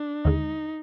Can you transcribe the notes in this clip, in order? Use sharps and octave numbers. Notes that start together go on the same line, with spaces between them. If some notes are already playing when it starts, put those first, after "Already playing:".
Already playing: D4
D#2 D3 G#3 D#4